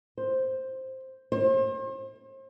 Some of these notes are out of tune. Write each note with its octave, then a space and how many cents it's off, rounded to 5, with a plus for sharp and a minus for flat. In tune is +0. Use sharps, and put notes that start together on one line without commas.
C5 +5
C5 +40